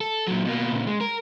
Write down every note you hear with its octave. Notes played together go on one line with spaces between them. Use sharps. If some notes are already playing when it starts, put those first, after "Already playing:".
A4
A#2 F#3
B2 A#3
A#2 C#3
G#3
A#4